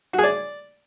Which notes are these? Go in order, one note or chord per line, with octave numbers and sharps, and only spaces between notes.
F#4
G#4
D5